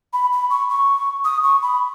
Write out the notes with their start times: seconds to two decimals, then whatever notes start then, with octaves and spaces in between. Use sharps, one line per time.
0.13 B5
0.32 B5
0.50 C#6
0.70 C#6
1.25 D#6
1.44 C#6
1.62 B5